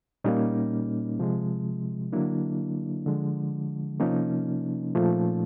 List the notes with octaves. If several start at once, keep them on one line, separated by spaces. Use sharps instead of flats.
A#2 G3 A#3 C#4 D#4
C3 F3 G#3
D3 F#3 A#3 D4 E4
D3 F3 G#3
C3 F3 A#3 C#4 D#4
A#2 F3 A3